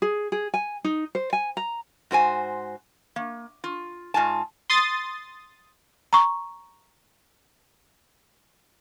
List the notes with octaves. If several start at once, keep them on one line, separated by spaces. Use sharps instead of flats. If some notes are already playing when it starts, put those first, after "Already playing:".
G#4
G#4
G#5
D#4
C5
G#5
A#5
G#2 F#4 C5 G#5
A#3
F4
G#2 F4 G#5 A5
C6 D#6 A6
A#5 C#6